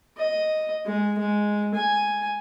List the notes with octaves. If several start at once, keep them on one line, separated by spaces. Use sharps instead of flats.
D#5
G#3
G#3
G#5